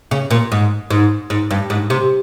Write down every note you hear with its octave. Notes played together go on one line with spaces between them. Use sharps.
C#3
A#2
G#2
G#2
G#2
G2
G#2
C3